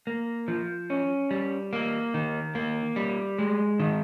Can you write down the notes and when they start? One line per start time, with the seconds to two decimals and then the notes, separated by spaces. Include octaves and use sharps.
0.07 A#3
0.48 F3
0.90 C#4
1.31 G3
1.73 A#3
2.14 D#3
2.55 A#3
2.96 G3
3.38 G#3
3.79 D#3